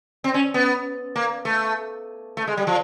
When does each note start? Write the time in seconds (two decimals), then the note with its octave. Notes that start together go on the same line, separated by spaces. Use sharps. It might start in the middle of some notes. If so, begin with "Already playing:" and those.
0.24 C4
0.34 C#4
0.54 B3
1.16 A#3
1.45 A3
2.37 A3
2.47 G#3
2.57 G3
2.67 F3